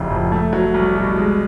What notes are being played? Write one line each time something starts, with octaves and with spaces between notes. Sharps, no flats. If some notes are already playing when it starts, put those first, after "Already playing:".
Already playing: F1 C#3 E3
F2
A3
F#3
C2
B2
G#3